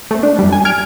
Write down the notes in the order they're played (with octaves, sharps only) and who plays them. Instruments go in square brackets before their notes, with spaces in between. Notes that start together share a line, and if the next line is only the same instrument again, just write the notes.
[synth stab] A3 C4
D4
F#2 G3
G#5
F6 G#6 D7